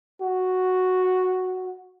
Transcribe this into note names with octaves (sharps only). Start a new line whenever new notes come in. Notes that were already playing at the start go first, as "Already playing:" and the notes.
F#4